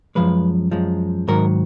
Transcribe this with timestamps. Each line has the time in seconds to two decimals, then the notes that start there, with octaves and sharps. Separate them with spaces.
0.15 F#2 F3 G#3 B4
0.71 F#2 F3 G#3
1.28 G#2 D#3 F#3 A#4